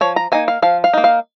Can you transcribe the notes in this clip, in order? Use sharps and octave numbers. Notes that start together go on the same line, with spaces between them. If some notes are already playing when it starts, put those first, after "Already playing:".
F3 C#5
A#5
A#3 D#4 G#5
F5
F3 F5
F5
A#3 D#4
F5